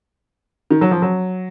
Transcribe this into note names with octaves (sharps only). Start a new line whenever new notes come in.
D#3
F#3
F3
F#3